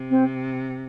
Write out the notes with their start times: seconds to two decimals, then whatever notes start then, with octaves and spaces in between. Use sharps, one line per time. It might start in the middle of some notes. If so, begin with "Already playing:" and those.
Already playing: C3
0.10 C4